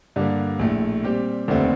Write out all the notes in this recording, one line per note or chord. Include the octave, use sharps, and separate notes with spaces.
G2 D3 G3 A#3
A#1 A2 A3
A#2 G3 C4 G4
F1 D#2 D3 A3 C4